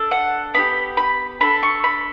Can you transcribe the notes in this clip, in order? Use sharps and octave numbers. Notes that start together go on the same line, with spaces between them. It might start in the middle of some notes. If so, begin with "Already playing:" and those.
Already playing: D4 A4
F#5
B3 D4 G4 B5
B5
D4 A4 B5
C#6
B5